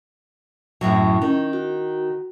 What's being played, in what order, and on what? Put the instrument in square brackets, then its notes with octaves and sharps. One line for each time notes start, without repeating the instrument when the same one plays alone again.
[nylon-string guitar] F#2 A2 F#3
[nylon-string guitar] D#3 [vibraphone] C#4
[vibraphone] F#4